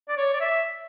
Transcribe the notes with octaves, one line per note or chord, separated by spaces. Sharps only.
D5
C#5
D5
E5